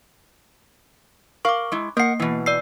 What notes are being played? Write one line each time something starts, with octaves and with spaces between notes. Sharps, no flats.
A#4 F5 C#6 D6
G#3 E4
A#3 A#4 F#5 C7
B2 E3
D5 E6 C7